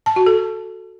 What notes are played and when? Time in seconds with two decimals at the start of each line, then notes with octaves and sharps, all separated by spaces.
0.06 A5
0.16 F#4
0.26 A4